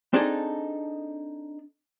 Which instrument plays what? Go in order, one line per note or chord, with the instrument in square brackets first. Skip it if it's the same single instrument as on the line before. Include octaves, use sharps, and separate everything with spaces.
[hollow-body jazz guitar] C4 D4 D#4 G#4 A4